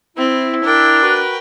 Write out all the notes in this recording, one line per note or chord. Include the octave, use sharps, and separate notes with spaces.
C4 E4
D4 A#4 G5
F#4 B4